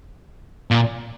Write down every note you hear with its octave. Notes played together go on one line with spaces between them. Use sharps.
A#2